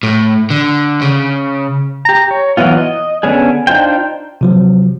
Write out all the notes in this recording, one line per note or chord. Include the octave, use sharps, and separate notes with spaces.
A2
D3
C#3
G4 A#5
C#5
E3 F#3 B3 F4
D#5
D3 B3 C#4 D4 G#4
D4 D#4 F4 C5 G5
C3 F3 F#3